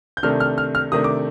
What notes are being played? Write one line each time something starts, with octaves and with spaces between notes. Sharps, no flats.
G6
C3 D#3 A3 D4 F6
F6
F6
F6
C3 D#3 A3 D4 D#6
D6